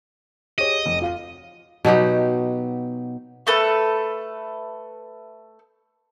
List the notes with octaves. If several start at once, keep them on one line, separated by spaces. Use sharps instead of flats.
G4 G#4 C#5 D#5
F1
F4 F5 D#7
B2 F#3 D#4 G4
A3 A4 B4